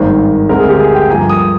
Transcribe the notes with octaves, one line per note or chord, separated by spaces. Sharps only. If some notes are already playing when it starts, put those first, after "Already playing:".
Already playing: G#1 G2 D#3 A#3 C5
D2 D3 G#3 C4 A#4
G#4
G4
G#4
G5
G2 F3 A#3 G#5
A#5
D#6